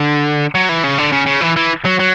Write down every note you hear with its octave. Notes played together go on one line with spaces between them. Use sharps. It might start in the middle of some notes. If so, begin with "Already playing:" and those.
Already playing: D3
F#3
E3
C#3
D3
C#3
C#3
E3
E3
F#3
F#3